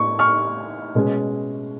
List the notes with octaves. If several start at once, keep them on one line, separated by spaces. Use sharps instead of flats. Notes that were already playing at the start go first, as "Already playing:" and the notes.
Already playing: A2 B3 D4 C#6
C#6 F6
B2 G#3 C#4